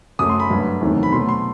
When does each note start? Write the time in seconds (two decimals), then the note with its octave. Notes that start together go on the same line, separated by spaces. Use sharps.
0.19 F#2 F#3 A3 D#6
0.29 C6
0.40 B5
0.50 G2 F#3 A3
0.81 E2 C3 D#3 F#3 A3
1.03 B5
1.12 B2 F#3 A3 C6
1.29 C6